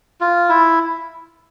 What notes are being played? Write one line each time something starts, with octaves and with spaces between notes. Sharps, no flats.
F4
E4